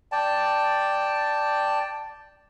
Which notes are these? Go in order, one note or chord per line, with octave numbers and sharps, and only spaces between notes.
D5 G5 A5